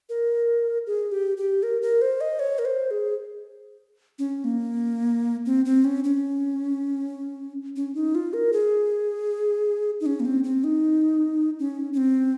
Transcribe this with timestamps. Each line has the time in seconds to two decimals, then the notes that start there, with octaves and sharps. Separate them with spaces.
0.09 A#4
0.87 G#4
1.12 G4
1.37 G4
1.63 A#4
1.82 A#4
2.02 C5
2.21 D#5
2.39 C#5
2.59 A#4
2.65 C5
2.91 G#4
4.19 C#4
4.44 A#3
5.46 C4
5.65 C4
5.84 C#4
6.04 C#4
7.76 C#4
7.95 D#4
8.15 F4
8.33 A#4
8.53 G#4
10.00 D#4
10.06 C#4
10.20 A#3
10.25 C4
10.44 C4
10.64 D#4
11.59 C#4
11.93 C#4
11.97 C4